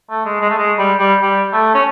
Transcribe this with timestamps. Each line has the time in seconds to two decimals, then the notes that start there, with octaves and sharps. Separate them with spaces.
0.09 A3
0.25 G#3
0.41 G#3
0.50 A3
0.58 G#3
0.78 G3
0.99 G3
1.21 G3
1.53 A3
1.74 C#4